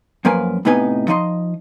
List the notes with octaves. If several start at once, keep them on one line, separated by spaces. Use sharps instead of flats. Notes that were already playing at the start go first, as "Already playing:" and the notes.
F#2 F3 A#3 A#4 B4 G#5
A2 C3 B3 D#4 B4 G#5
F3 D#4 D#5 B5 C6